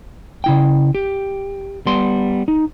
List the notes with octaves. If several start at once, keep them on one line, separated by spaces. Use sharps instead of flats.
C#3 E4 G5
G4
G3 B3 C6
D#4